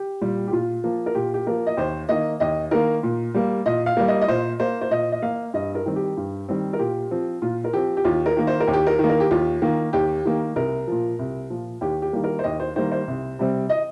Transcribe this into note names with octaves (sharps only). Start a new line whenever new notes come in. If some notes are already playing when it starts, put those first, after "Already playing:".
Already playing: G4
A#2 G3
G4
A#2 F4
F3 A#3
A#4
A#2 G4
G4
F3 A#3 A#4
D#5
D#2 C5
D#3 A#3 D#5
D#2 D#5
D#3 A#3 A#4
A#2
G3 A#3
A#2 D#5
F5
G3 A#3
D#5
D#5
A#2 C5
A#3 C5
C5
A#2 D#5
D#5
A#3 F5
G2 D#5
A#4
D#3 G3 C4
G4
G2
D#3 G3 C4
A#4
A#2 G4
F3 C4
A#2 F4
A#4
F3 C4 G4
G4
D#2 F4
A#4
D#3 A#3
C5
A#4
D#2
G4
A#4
D#3 A#3
A#4
G4
D#2 F4
D#3 A#3
D#2 G4
D#3 A#3
C2 A#4
A#2 F3
C2
A#2 F3
D#2 G4
G4
D#3 G3 A#3
A#4
C5
D#2 D#5
C5
D#3 G3 A#3 C5
C5
C2
C3 G3 C4
D#5